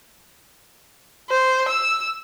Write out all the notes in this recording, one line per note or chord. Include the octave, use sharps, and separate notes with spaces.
C5
E6